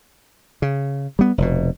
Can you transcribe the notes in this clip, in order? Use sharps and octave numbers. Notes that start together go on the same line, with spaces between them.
C#3
G3 B3
F1 B2